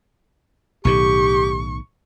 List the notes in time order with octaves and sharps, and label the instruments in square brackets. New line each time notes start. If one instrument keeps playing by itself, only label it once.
[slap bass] B1 A2 D#3 [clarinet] G4 [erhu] C#6